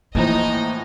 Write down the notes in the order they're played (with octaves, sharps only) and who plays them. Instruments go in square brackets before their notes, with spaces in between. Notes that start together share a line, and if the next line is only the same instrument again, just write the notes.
[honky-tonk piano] A2 E3 F3 [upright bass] A#3 F4 [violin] D#4 D#5